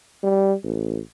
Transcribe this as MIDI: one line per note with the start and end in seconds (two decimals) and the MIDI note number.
0.24 0.54 55
0.64 1.00 33